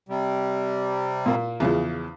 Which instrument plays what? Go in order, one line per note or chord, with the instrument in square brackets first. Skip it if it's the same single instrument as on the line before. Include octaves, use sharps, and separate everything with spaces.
[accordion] C3 G3
[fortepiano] A#2 A#3
E2 C#3 F3